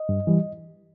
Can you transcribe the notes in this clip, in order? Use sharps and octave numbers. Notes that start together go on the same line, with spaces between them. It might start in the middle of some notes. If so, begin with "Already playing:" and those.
Already playing: D#5
G2
E3 G3